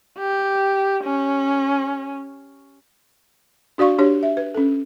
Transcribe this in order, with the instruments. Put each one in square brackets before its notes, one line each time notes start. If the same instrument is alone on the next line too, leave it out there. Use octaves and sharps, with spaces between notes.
[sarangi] G4
C#4
[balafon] D4 F#4 D5 F5 C#6
D4 G4 C#5
E5
B4
C#4 A4